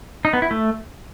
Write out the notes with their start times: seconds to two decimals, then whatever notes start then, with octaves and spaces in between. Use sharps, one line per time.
0.25 D#4
0.33 B3
0.42 E4
0.51 A3